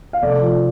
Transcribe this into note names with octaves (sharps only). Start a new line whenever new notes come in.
F5
F1 A4 D5
F3